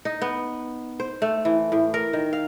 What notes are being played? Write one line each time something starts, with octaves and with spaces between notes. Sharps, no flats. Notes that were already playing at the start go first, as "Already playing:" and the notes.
D#4
B3
C5
A3
E3
A2
A#4
D#3
F5